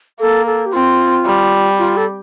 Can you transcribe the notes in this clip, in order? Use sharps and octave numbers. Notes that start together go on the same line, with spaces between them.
A#3 A4
A4
G4
C4 F4
G3
F4
A4